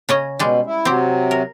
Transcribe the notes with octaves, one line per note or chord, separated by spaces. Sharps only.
C#3 C#4 D#5
B2 G3 G#3
E4
C3 F#3 C4 G4
A#4